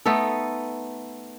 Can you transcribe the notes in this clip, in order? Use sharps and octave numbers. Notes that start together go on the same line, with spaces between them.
A3 B3 D#4 A4